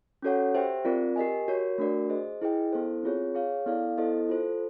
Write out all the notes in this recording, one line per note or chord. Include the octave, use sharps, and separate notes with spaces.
C#4 F#4 A4 C#5 F#5
G4 C5 E5 G5
C4 F4 A#4 D5
G4 A#4 D#5 G#5
F#4 A#4 C#5
A3 D4 F#4 A#4 D5
G#4 C5 D#5
E4 G#4 B4 D#5 G5
B3 E4 A4 C5
C4 F4 G#4 C#5
G#4 C#5 F5
B3 E4 A4 D5 F5
B3 E4 A4 C5 D#5
F4 A4 C5